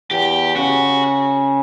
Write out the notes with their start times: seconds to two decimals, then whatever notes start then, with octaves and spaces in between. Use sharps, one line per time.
0.11 E2 G4
0.56 C#3 F#4